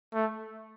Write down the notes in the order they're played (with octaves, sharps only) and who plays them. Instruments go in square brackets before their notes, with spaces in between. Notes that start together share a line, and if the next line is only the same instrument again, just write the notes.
[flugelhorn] A3